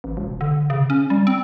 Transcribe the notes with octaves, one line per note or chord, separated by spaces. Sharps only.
A1
E1
D3
C#3
C#4
G3
C4